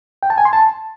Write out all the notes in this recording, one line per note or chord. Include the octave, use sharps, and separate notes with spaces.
G5
A5
G#5
C6
A5